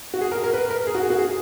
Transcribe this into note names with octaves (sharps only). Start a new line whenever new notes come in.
F#4
G#4
A#4
A#4
B4
A#4
G#4
F#4
G#4
F#4
G#4